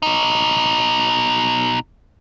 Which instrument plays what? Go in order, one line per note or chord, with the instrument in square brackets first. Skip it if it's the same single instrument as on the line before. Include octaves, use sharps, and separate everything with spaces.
[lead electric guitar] B2 D#4